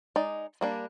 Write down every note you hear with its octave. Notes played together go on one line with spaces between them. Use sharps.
G#3 D#4 D5
G3 A#3 D4